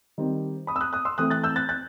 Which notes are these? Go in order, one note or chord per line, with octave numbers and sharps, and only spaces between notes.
D#3 G3 C4
B5 D#6
E6
D#6 F#6
D#6 F#6
C6 E6
E3 A3 C4 D#6 F#6
F#6 A6
E6 G6
F#6 A6
F#6 A6